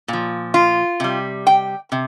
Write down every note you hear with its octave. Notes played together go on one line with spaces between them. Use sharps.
A#2 F3
F4
C3 G3
G5
C3